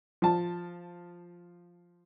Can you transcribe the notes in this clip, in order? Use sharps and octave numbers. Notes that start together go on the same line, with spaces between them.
F3 A5